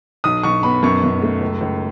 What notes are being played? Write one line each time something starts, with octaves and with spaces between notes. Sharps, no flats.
B1 D#6
B1 C#6
B3 B5
F#2 C#6
F#2
A3
C#2
C#2